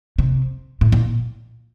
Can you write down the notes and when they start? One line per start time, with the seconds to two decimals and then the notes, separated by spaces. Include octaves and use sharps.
0.18 C3
0.81 A2
0.92 A#2